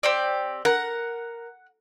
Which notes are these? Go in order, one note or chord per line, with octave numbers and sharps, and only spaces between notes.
C4 G4 D5
A#4 F#5